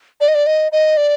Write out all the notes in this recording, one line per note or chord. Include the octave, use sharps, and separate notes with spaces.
D5
D#5
D5
D#5
D#5
D5